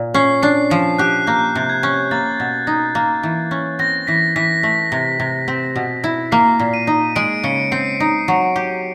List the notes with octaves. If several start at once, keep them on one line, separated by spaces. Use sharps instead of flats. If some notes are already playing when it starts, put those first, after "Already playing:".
Already playing: A#2
C#4 C7
D4 C7
F3 C7
G4 F#6
A#3 G6
C3
G#6
C#4
A#3 A6
B2
D#4
A#3
E3
C#4
C4 A#6
E3 B6
E3 B6
A3
C3
C3
C4
B2
E4
A#3 C7
A#2
D#7
D#4
G#3 D7
C#3 C#7
C4 C7
D#4
F#3
G4